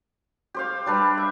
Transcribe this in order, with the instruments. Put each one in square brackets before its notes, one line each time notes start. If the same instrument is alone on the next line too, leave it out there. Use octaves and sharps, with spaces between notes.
[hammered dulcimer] G4 C5 F5
G3 D4 B4
E5